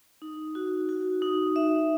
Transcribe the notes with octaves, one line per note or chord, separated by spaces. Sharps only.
D#4
F#4
F#4
D#4
E5